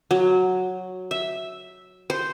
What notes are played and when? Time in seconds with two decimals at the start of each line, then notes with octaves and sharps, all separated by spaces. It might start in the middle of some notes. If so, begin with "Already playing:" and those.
0.11 F#3
1.11 E5
2.10 C5